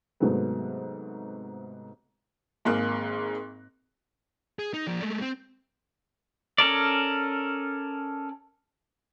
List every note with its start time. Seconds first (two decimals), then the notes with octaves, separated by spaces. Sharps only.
0.20 G#2 C3 F#3 A3 B3
2.65 G#1 G#2 A#3 G#4 A#4 F#6
4.59 G#4
4.74 D#4
4.87 F3 D5
5.02 G#3 A3
5.21 C4
6.58 C#4 A4 A#4 D5